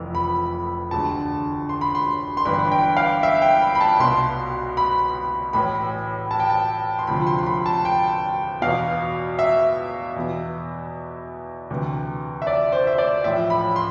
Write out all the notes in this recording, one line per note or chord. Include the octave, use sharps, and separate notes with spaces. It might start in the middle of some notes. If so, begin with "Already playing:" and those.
Already playing: F1 F2 E3
B5
E1 D2 D3 A5
C6
B5
C6
C6
G1 G2 E3 B5
G5
F5
E5
G5
B5
B5
A5
C2 B2 C6
B5
A1 A2 E3 B5
A5
G5
A5
C6
D2 C3 F3 B5
C6
C6
B5
A5
G5
E2 B2 F5
E5
E2 B2
D2 C3 E3
E5
D5
C5
E5
D5
A1 A2 F3 E5
B5
C6